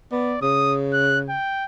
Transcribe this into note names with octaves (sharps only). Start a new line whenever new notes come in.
B3 D5
C#3 D#6
F#6
G5